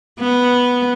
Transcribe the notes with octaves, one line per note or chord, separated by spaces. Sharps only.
B3